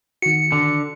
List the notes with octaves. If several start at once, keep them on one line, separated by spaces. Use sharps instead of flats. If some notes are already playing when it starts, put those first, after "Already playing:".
D#3 F#4 C#7
D3